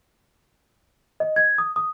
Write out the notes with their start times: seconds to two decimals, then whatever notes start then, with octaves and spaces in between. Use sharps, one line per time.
1.20 D#5
1.36 G#6
1.58 D#6
1.76 D#6